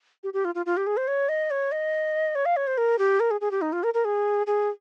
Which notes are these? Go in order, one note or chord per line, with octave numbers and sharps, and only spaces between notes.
G4
G4
F4
F4
F4
G4
G#4
C5
C#5
D#5
C#5
D#5
C#5
F5
C#5
C5
A#4
G4
A#4
G#4
G#4
G4
D#4
F4
A#4
A#4
G#4
G#4